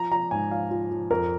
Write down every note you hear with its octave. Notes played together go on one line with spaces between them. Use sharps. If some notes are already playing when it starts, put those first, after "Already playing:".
Already playing: F3 A#5
F3 A#5
G#2 G#5
F3 F5
F3
F3
F2 A#4